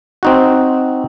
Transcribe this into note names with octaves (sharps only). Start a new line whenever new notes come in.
C4 D#4 F#4